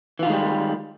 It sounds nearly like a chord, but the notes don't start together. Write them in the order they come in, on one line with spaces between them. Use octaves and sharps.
E3 F4 D#3 G#3 G3